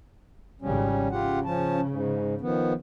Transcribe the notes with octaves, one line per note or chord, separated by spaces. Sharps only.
G#1 C#3 F3 G3 C#4
C#3 F4 G4 F#5
F3 C#4 A5
G#2
D#3 F3 B3